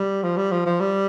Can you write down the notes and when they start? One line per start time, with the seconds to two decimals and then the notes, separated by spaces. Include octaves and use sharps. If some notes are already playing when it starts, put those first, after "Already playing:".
Already playing: G3
0.23 F3
0.37 G3
0.52 F3
0.66 F3
0.80 G3